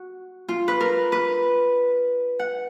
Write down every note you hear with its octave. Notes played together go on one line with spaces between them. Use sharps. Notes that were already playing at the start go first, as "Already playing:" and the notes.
Already playing: F#4
F4
B4
A#4
B4
F#5